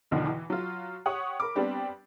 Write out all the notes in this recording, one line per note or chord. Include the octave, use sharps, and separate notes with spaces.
B1 E2 B2 D3 D#3 F3
E3
F#3 F4
G4 C#5 F#5 C#6 D#6
A#4 B5 D6
G3 B3 C4 D4 G4